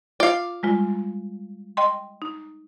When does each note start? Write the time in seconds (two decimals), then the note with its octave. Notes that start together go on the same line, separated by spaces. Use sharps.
0.20 F4 D5 F5
0.63 G3 G#3 F4
1.77 D#5 G5 C6
2.22 D#4